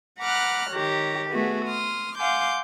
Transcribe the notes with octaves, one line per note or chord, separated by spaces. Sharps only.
F#5 A#5 B5 D6 F6 F#6
D#3 G4 C#5 A#5
A3 B3 F#4 G#4 B4
C6 D#6 F6
F5 F#5 G#5 C6 D6 G6